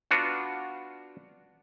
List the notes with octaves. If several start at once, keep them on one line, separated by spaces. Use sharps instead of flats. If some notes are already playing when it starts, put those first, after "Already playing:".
B3 D4 F4 F#4